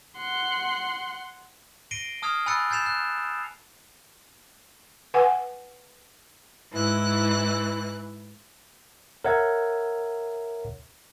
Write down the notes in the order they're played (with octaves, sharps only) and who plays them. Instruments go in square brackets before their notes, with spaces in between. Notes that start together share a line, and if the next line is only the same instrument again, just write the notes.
[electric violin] F#5 C6
[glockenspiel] A#6 C7 D7 D#7 G7
A5 D#6 F6 G#6 C7 F7
G#5 B5 E6 F#6 A6 C#7
F6 G6 A6 C7 E7 F7
F#6
[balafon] B4 F#5 G#5
[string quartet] G#2 E3 E4 F#6
[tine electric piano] A#4 C#5 E5 F#5 G#6